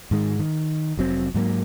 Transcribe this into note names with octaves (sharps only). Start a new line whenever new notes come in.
G#2 D#3 G#3
D#3
F1 F#3 C4
G#2 F#3 G3 A#3